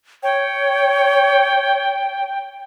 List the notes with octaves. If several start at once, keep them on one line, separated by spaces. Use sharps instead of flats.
C#5 G5